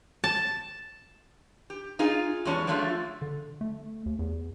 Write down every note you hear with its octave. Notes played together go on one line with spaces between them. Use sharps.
A5
G4
D#4 F4 G#4
E2 G3 G#3 C#4 C#5 A5
F3 F#3 G#3 A3 D4 F4
D3
A3
D#2
E2